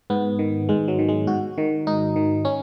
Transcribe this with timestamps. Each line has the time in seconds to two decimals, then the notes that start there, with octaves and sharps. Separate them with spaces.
0.10 G#2 B3
0.39 D#3
0.69 G#2 G#3
0.88 F#3
0.99 D#3
1.08 G#3
1.27 G#2 F#4
1.58 D#3
1.87 G#2 D#4
2.16 D#3
2.45 C#4